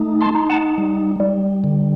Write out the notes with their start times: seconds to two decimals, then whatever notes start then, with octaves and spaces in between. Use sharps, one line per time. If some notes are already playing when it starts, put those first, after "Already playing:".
Already playing: A3 D#4
0.21 A5 C6
0.35 D#4
0.49 F#5 A5
0.78 G3
1.20 G3
1.64 D3